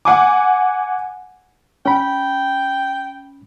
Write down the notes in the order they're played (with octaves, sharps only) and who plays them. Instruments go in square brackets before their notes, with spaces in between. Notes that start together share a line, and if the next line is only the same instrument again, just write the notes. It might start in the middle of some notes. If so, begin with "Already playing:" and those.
[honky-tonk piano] F#5 G#5 D6
[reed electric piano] C#4 B5 [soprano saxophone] G5